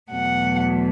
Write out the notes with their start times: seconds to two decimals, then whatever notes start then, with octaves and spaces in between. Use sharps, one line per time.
0.10 E2 B2 F#3 A3 F#5